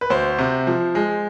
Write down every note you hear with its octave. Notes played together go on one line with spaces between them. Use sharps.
B4
D2 C5
C3
F3
G#3